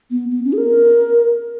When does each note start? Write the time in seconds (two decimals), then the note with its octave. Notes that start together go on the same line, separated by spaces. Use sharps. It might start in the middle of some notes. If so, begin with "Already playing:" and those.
0.11 B3
0.31 B3
0.45 C#4
0.53 G#4
0.58 A#4